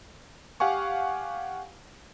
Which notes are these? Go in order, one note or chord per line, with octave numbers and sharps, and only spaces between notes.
G4 F5 F#5 G#5 C#6